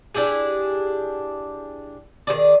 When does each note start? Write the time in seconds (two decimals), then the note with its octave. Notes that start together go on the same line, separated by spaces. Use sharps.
0.15 D4 E4 G4 G#4
2.27 D#3 F3 G#4 D5